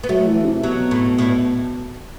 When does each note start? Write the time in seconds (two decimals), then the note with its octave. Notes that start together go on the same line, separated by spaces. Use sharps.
0.03 B3
0.09 F#3 A3
0.27 E3
0.45 C3
0.63 B2 F#3
0.91 A2
1.18 A2